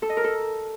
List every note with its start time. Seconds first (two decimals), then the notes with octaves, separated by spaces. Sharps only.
0.02 A4
0.10 D#5
0.17 A#4
0.24 A4